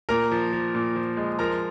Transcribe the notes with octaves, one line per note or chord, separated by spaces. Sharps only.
A#2 A#4 A#5
F3
F3
A#2
F3
G#3
F3 A#4 A#5